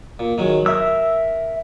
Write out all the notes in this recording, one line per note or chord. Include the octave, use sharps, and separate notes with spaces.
A#2
D#3 F#3 G#3
A#4 E5 E6